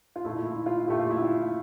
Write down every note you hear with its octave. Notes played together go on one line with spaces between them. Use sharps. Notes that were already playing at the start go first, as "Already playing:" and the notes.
F4
A#2 A3 E4
E4
F4
A#2 A3 G4
F4
E4
F4